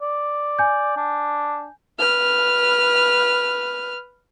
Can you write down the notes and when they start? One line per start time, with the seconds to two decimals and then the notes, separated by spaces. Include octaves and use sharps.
0.02 D5
0.59 G#5 G6
0.97 D4
1.98 B4 F6